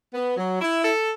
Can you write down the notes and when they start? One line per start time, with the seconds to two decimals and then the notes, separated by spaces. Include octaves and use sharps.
0.14 B3
0.37 F#3
0.61 E4
0.85 A4